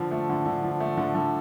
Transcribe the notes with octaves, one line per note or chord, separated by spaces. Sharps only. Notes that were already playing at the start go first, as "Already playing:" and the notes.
Already playing: D3 F3
A3
D3
D3
F3
A3
D3
D3